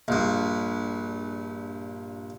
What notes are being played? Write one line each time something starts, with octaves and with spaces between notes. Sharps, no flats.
A#1 G2